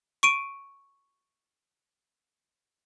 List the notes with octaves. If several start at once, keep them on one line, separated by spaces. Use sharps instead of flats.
C#6 D7 D#7